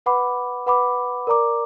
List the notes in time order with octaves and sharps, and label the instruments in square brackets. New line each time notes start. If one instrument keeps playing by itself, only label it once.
[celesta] B4 F#5 B5 D6
B4 F#5 B5 D6
A#4 D5 A#5 D6